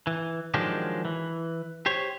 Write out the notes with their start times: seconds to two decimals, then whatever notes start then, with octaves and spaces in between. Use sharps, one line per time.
0.07 E3
0.54 D#3 F3 F#3 G#3 D4 G4
1.05 E3
1.86 G4 C5 C#5